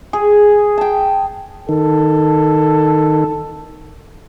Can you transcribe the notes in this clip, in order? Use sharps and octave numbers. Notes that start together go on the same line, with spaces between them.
G#4
G5 A5
D#3 A4